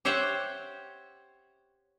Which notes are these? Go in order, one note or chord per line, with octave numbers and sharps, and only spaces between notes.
G4 C5 C#5 E5 F#5 G5